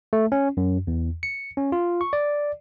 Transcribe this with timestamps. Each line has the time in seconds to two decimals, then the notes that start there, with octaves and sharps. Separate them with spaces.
0.13 A3
0.32 C#4
0.57 F#2
0.87 E2
1.23 C#7
1.57 C#4
1.72 F4
2.01 C#6
2.13 D5